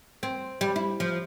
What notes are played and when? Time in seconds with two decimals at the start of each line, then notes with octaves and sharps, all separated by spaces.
0.23 C4
0.61 G3
0.76 E4
1.00 F3